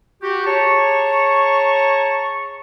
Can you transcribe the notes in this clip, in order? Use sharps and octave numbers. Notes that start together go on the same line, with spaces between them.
F#4 G4
G#4 C#5 A5 A#5 C#6